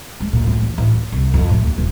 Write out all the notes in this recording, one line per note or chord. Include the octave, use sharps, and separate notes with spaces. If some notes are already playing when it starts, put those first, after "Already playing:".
G#3
A#2
A2
E2
A1
D#2
C2
F2
A2
D#2
D#1